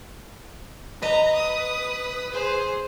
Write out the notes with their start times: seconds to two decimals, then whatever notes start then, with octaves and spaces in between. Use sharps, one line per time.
1.02 B4 D#5 A#5
1.35 D#6
2.32 G#4 C5